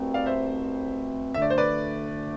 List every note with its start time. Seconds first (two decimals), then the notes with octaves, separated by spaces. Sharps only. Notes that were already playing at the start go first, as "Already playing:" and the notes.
Already playing: C2 B2 A3 C4
0.14 D5 F5
0.26 C5 E5
1.34 D2 D3 A3 D4 E5
1.42 D5
1.50 C5
1.58 B4 D5